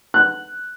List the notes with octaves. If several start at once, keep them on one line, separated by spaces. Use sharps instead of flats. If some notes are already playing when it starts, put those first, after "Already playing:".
F#6